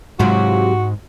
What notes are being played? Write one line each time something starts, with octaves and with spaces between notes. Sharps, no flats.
G#2 C3 F#3 G#3 F4 F#4